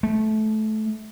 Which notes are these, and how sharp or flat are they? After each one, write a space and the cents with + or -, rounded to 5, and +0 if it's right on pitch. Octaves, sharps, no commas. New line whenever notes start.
A3 -20